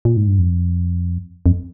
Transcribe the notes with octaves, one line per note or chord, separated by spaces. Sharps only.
A#2
G#2
G2
F2
F2